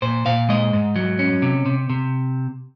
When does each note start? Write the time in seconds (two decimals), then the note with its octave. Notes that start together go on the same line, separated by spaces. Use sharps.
0.02 A#2 C5
0.26 A#2 F5
0.49 G#3 D#5
0.73 G#2
0.96 F#3
1.19 C#4
1.42 C3
1.66 C3
1.90 C3